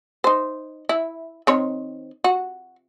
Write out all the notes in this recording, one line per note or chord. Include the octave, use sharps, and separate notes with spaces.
D#4 C5
E4
D#3 C4 C#5
F#4